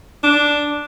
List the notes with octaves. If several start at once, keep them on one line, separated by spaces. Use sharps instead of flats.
D4